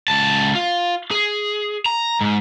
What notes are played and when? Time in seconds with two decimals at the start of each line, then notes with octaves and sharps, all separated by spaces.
0.08 C#2 A5
0.55 F4
1.11 G#4
1.86 A#5
2.21 G#2